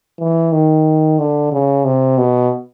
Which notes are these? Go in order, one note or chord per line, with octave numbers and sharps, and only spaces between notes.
E3
D#3
D3
C#3
C3
B2